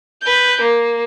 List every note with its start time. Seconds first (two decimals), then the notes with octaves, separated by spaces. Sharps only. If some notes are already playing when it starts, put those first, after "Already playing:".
0.22 B4 G6
0.61 A#3